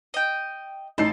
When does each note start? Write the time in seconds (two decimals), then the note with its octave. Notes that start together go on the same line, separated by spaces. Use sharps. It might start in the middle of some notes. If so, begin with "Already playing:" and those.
0.14 D#5 G5
0.98 A1 D#4 A4 C7